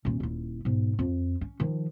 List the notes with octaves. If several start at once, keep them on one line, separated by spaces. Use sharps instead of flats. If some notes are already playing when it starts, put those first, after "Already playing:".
D#1 C#4
D#1 E4
B1 G#2
F2
C#4
D#3 F3